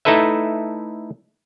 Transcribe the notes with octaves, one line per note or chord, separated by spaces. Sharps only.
A3 D#4 E4 A4 B4 E5